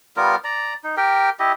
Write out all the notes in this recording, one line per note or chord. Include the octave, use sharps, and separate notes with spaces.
G3 B3 F4 A#4
D5 A#5
D#4
G4 A#4 G5
E4 G4 D#5